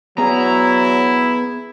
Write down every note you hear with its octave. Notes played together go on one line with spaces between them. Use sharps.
F#3 B3 E4 G#4 A#5